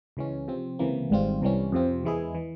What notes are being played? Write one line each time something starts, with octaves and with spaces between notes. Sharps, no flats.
C#2 C#3 E3 G#3 C#4
C3 F3 C4
C#2 C3 E3 A#3
G#1 G#2 G3 C4 F4
C2 C3 E3 G3 C#4
F2 C3 F3 C4
E2 E3 G#3 E4 G#4
E3